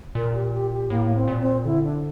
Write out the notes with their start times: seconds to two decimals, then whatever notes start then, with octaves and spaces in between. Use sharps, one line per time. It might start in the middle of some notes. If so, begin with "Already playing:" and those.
0.15 A#2 A#4
0.34 G4
0.53 G4
0.72 G4
0.90 A2 A#3
1.06 A#3
1.15 C4
1.28 A#2
1.40 C4
1.65 D3 E4
1.84 D4